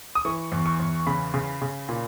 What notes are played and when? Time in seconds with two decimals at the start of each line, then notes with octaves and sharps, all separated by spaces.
0.15 D#6
0.25 E3 C#6
0.52 E2
0.66 C#6
0.80 E2
1.07 C#3 B5
1.34 C#3
1.62 C#3
1.89 A#2